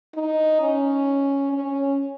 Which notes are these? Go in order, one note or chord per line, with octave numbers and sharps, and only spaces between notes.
D#4
C#4
C#4